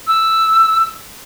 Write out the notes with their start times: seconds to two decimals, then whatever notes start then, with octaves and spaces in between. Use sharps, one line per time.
0.07 E6